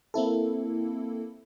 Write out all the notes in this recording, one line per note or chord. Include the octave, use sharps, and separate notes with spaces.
A#3 C4 E4 A4